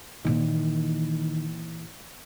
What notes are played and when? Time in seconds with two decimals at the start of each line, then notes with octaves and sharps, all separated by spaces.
0.25 A#2 D#3 E3